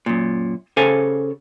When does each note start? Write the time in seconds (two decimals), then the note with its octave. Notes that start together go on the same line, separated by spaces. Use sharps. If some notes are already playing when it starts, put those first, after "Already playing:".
0.06 F#2 A#2
0.77 C#3 G4 A4 C5 F5 G#5